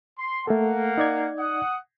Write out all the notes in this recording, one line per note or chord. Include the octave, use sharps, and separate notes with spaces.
C6
A3 A#3 A4 F#5
D#4 D5 G#6
F#5 D#6